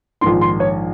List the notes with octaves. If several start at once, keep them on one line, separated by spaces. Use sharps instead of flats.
A#1 G#2 D#3 C6
C6
C#5